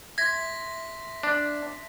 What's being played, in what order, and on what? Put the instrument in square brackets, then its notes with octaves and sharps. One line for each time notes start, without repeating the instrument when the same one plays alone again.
[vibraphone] E5 C6 [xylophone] G#6 [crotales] A#6 B6
[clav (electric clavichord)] D4